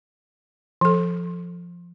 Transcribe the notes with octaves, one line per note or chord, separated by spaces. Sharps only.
F3 A4